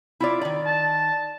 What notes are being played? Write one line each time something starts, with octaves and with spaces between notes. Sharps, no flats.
E4 F4 D5
D#3 D5
A5